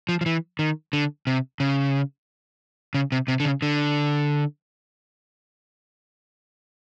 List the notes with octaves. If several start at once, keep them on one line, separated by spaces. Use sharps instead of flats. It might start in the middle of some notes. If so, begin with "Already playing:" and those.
F3
F3
E3
D#3
D3
C3
C#3
C#3
C3
C3
D3
C#3
D3